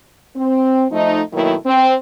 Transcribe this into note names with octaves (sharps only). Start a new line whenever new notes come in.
C4
F3 A3 D#4
B2 D#3 F#3 A3 A#3 E4
C4